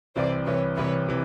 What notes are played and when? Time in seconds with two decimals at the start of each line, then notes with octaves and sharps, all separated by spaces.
0.16 C2 C3 E3 C5 D5
0.46 C2 C3 E3 B4 C#5
0.76 C2 C3 E3 B4 C#5
1.08 C3 E3